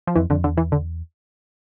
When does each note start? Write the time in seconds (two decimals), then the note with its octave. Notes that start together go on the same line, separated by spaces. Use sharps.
0.07 F3
0.16 F2 E3
0.30 F2 D3
0.44 E2 D3
0.57 E3
0.72 D3